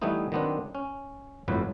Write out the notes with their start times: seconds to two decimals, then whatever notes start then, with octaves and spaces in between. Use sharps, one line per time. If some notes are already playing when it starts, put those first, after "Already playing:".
0.02 E3 G3 A3 B3 D#4 E4
0.32 D#3 F#3 B3 C4 D4
0.75 C#4
1.48 G1 F2 A2 F#3 B4